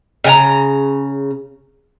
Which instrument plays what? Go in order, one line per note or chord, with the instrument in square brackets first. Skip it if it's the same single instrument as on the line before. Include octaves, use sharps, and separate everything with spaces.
[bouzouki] C#3 G#4 A#5